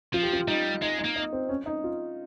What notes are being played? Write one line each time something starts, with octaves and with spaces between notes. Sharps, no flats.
F3 F4
G4
F4
G3 D#4
G#3 D#4
D#4
A#3
D#4
C4
C#4
D#4
F4